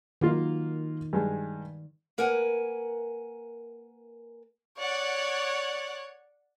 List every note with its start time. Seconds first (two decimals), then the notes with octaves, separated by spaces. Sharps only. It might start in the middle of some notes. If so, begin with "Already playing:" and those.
0.21 D#3 F#3 A#3 F4
1.13 G2 G#3
2.18 A#3 A#4 B4 F#5 G#5
4.79 C#5 D5 F#5